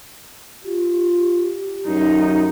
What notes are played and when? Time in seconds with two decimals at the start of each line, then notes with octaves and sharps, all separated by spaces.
0.64 F4 G4
1.88 F#2 D#4